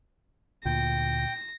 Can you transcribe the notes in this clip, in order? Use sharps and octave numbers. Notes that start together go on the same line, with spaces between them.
D2 A#2 G5 A#6